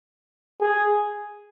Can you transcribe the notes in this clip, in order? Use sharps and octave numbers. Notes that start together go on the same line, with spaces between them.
G#4